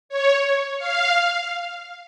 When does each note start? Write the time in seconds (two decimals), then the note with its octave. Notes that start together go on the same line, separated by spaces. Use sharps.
0.09 C#5
0.79 F5